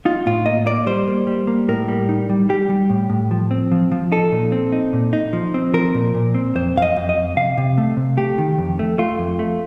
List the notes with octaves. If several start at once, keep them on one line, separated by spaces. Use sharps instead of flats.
D#4 F4
A2 F4
A#3 D#5
A#3 D5
G3 C5
A#3
G3
A#3
A2 A#4
G3
D#4
G3
G3 G4
G3
A2
A2
F3
C4
F3
F3
D#4 A4
A#2
C4
D#4
A#2
D#4
F3
C4
F3 A#4
A#2
A#2
C4
F2 C5
F2 F5
D#5
F2
D#5
F2
C3 F5
C3
A3
C3
A3 G4
D#3
F2
A3
A3 F4
F2
A3